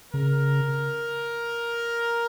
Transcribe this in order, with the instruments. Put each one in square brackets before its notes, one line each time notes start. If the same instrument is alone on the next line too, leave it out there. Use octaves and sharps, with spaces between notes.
[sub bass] C#3 [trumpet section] A#4